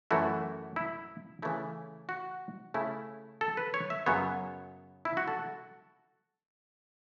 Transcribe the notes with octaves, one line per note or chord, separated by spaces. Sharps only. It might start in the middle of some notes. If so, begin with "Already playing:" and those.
F#2 E3 A3 E4 F#4
E4
C#3 E3 A3 E4
F#4
C#3 A3 E4
A4
B4
C#5
E5
F#2 C#3 F#3 B3 C#5
E4
F#4
A4